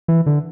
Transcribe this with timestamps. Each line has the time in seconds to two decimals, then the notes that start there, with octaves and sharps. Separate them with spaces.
0.08 E3
0.26 D3